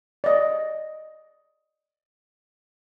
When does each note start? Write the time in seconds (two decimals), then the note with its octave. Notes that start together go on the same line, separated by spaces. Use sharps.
0.24 D5 D#5